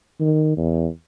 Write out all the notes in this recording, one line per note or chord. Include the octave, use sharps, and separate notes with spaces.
D#3
E2